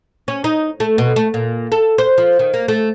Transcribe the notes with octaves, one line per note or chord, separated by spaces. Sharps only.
C#4
D#4
A3
B2
A3
A#2
A4
C5
F3
D#3
A#3
A3